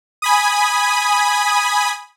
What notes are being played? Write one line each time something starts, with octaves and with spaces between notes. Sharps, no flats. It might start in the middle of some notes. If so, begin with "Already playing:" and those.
G#5 B5 D#6